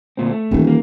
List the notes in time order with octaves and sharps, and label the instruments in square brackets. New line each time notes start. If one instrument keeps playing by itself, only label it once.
[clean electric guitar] D2 A#2 C4
A3
[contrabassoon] D#1 [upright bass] D#3 E3
[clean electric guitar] A#3